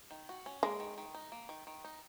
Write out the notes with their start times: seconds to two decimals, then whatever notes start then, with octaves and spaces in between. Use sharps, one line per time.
0.11 D#3
0.29 F#4
0.46 C#4
0.63 G#3 A#3
0.80 D#3
0.98 D#3
1.15 D#4
1.32 A#3
1.49 D#3
1.67 D#3
1.84 D#4